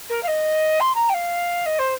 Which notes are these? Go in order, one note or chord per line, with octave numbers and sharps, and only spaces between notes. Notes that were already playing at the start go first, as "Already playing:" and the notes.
A#4
F5
D#5
C6
A#5
G5
F5
D#5
C5